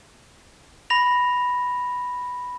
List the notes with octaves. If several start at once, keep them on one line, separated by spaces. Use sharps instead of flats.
B5 A#6 F7